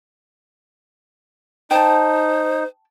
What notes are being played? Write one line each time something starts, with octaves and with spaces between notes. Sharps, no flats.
D#4 C5 G5 A5